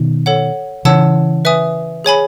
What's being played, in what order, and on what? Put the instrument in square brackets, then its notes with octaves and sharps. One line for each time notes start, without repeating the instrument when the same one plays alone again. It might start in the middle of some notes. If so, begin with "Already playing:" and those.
Already playing: [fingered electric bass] B2 D#3
[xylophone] A4 C#5 F#5
[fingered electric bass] C#3 E3 [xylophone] C#5 F#5 A5 E6
[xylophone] B4 E5 G#5 D#6
G#4 C#5 G#5 B5